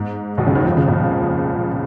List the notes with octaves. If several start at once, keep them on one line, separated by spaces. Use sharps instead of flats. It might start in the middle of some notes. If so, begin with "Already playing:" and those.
Already playing: G#2
B1 B2
C#2 C#3
D#2 D#3
F2 F3
C#2 C#3
A#2